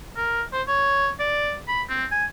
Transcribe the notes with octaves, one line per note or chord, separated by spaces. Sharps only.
A#4
C5
C#5
D5
B5
C4
G#5